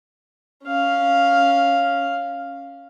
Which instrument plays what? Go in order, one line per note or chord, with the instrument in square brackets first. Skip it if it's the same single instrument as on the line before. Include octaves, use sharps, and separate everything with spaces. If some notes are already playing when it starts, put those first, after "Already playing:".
[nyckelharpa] C#4 F5